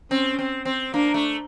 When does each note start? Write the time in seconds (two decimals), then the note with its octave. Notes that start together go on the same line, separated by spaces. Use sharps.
0.11 C4 C#4
0.39 C4
0.65 C4
0.94 A#3 D4
1.14 A3